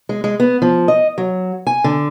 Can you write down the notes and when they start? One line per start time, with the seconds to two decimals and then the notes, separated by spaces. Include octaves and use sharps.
0.09 G#3
0.24 G#3
0.40 B3
0.62 F3
0.88 D#5
1.18 F#3
1.67 G#5
1.84 D3